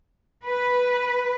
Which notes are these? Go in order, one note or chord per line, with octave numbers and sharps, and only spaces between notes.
B4